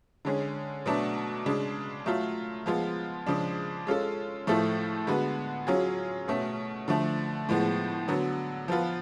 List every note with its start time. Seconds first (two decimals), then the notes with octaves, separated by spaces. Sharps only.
0.25 D3 G#3 C#4 G#4
0.86 B2 F#3 A3 D4
1.46 C#3 G#3 D4
2.06 F#3 A3 F4
2.66 F3 G#3 B3 F4
3.26 C#3 F3 G#3 D4
3.87 G#3 C#4 F4 A4
4.47 A2 F3 A3 F4 A4
5.07 D3 G#3 B3 F#4 B4
5.67 F#3 C#4 F4 G#4
6.28 B2 A3 C#4
6.88 D3 F3 A3
7.49 A2 F3 G#3 B3
8.08 D3 F#3 B3
8.68 F3 B3 F4 B4